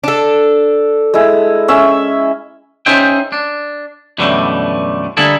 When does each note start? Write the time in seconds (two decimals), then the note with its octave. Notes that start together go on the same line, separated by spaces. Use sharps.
0.04 D4 A4
1.14 G#3 E4
1.68 C#4 E5 E6
2.86 C#4 D#4 G#4 C5 E5 G5
3.32 D4
4.18 F#2 B2 D3 E3 G3 A3
5.17 D3 G3 A#3 E4 G#4 A4